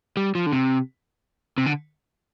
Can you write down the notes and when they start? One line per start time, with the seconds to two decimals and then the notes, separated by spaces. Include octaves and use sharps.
0.17 G3
0.35 F3
0.46 D3
0.52 C3
1.58 C3
1.66 D3